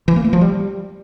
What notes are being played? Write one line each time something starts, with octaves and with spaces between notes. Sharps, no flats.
E3
A#3
A3
F3
G3